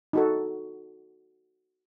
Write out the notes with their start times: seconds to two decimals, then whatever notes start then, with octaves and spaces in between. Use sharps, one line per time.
0.13 D#4 F#4 A4